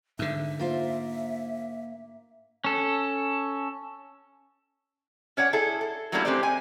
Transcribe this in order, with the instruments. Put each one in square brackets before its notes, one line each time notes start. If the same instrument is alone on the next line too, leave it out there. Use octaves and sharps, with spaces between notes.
[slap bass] G#2 D3 [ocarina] E5
[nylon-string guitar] A#3 F4 C5
[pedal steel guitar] C#4 A4
[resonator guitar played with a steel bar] C#4 C#5 D5 F#5
E4 G#4 A4
A4
F#3 G3 A3 A#3 D4 E4
G#3 C4 G4 C5 D5
G#5